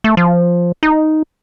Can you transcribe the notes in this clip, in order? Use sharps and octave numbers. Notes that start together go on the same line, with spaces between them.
A3
F3
D#4